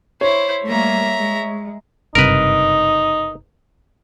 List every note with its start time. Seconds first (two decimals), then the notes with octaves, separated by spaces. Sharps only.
0.21 E4 C5 C#5
0.68 G3 A3 A#3 E5 A#5
1.15 G#3
2.15 F#1 G2 C3 D#4 A#4 B4